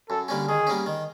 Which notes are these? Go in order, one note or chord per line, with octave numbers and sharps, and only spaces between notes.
F#2 A4
D3 G3 A#3 C#4
D#3 G#4
G3 A#3 C#4
D#3